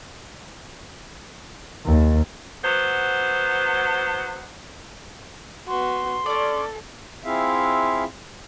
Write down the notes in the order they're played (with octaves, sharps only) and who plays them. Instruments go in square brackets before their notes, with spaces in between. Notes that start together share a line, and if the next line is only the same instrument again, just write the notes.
[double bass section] D#2
[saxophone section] F#3 B3 C5
[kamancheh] B3 F#4 [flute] C6
[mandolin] C#4 D5 [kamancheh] A4
[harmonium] C4 E4 F4 G#4 E5 F5